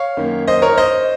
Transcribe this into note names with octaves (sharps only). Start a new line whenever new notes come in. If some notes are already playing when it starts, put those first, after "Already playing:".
Already playing: C#5 F5
F#2 D#3 A#3
C5 D#5
A#4 C#5
C5 D#5